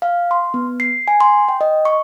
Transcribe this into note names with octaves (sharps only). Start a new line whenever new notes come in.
F5
C6
B3
C7
G#5
C6
G5
D#5
C#6